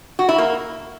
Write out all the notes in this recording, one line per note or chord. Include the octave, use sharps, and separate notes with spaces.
F#4
E4
A#3